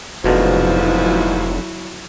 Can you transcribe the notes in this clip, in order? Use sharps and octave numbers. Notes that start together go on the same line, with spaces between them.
F1 D2 G#2 B2 D3 F3 F#3 E4